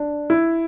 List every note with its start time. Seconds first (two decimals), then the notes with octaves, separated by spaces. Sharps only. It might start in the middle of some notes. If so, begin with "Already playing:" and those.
Already playing: D4
0.30 E4